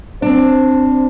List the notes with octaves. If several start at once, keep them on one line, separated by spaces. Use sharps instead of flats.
C4 D4 C5